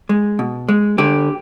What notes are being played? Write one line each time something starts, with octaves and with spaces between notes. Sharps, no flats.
G#3
B2
G#3
D3 G4